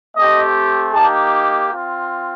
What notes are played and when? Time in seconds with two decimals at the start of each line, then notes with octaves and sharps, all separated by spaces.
0.16 A3 C4 G4 D#5
0.94 A#3 D#4 G4 A5
1.72 C4 F4